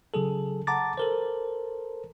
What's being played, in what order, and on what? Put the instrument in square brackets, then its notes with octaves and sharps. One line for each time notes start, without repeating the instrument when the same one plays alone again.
[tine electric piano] C#3 F#3 G#4 A4
F#5 A5 A#5 D6 A6
A4 A#4 C5